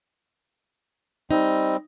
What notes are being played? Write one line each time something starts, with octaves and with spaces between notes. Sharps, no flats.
G3 C4 D#4